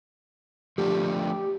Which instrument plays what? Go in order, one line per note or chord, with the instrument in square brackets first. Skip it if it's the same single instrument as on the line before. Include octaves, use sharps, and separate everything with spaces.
[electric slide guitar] F3 A3 D4 [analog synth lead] G4